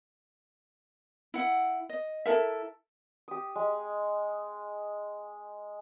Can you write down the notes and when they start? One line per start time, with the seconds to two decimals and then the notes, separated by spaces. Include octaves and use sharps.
1.34 E4 F#5
1.89 D#5
2.26 E4 A4 A#4 E5
3.28 G4 D#6
3.55 G#3